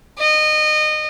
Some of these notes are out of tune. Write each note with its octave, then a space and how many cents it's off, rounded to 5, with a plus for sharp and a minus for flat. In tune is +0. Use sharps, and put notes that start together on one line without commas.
D#5 -25